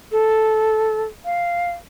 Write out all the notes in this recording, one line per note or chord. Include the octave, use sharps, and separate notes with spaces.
A4
F5